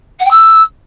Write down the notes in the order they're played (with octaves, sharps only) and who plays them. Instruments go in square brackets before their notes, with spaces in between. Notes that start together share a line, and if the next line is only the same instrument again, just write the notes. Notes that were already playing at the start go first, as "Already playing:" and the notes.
[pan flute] F#5
G5
E6